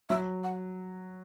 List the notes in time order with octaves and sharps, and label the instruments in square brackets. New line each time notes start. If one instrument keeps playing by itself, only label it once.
[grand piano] F#3 [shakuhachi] E5
[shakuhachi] F#5